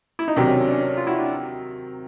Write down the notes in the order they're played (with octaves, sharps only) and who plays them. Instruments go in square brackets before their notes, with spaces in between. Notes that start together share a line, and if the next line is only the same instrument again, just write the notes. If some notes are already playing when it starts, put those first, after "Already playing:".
[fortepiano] E4
D#4
[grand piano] C3 D#3 F#3 [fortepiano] D4
[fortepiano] C#4
C#4
D4
C#4
D4
F4
E4 F#4
D4